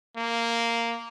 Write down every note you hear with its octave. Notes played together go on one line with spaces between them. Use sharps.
A#3